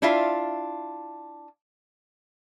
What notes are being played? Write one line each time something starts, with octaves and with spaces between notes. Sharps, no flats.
D4 E4 F4 E5 F5